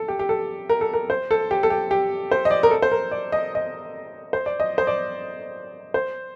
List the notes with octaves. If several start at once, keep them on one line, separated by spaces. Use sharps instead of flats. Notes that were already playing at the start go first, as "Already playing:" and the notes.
Already playing: A4
G4
G4
A4
A#4
A4
A#4
C5
A4
G4
A4
G4
G4
C5
D#5
D5
A#4
A4
C5
A#4
D5
D#5
D#5
C5
D5
D#5
C5
D5
C5